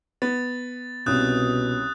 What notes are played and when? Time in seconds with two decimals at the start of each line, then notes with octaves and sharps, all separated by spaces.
0.22 B3 A6
1.06 C2 B2 C#4 D#6 F#6 G6